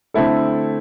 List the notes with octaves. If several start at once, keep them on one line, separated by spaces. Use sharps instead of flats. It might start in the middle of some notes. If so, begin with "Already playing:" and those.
D3 A3 C4 E4 A4